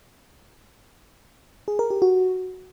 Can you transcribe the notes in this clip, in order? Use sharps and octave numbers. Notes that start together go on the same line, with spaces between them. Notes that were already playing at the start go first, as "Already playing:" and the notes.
G#4
A#4
G4
F#4